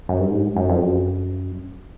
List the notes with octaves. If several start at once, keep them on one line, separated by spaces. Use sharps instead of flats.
F#2
G2
G#2
F#2
F2
F#2